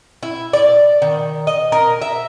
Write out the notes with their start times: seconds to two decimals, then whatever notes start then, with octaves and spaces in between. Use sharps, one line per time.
0.23 E4
0.53 D5
1.02 D#3
1.47 D#5
1.72 A#4
2.02 E5